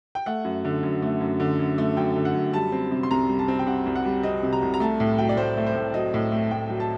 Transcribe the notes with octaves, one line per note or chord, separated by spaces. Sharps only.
G5
A3 F#5
F#2
D3
F#2
A3
F#2
D3
F#2
A3
F#2 G5
D3
F#5
F#2
G3 A5
C4
C3
C6
C2 A#5
G3
A5
C4
G5
C3 F#5
C2
F#5
G3
C4 D#5
C3
A#5
C2
A#5
A3 A5
A2
F#3 G5
D5
A2 C5
A3
C5
A2
F#3 D#5
A2
A3
A2 G5
F#3
A5